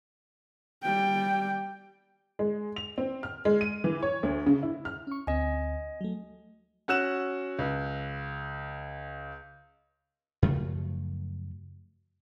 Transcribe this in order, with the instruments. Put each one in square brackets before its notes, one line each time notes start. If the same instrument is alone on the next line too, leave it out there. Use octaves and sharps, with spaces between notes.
[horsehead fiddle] G3 G5
[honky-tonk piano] G#3
F7
C4
F6
G#3
D#7
E3
C#5
D2
C#3
E4
F6
[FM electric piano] C#4 C#6
[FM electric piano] D2 C4 [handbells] D#5 G#5
[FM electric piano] F#3 A3
[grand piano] C#4 F#4 E6 F#6 E7
C#2
[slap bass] F#2 C#3 F3 A3